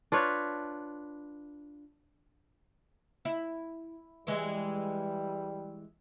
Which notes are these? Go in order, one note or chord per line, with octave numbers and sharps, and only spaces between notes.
D4 F4 B4 C#5
E4
E3 G3 G#3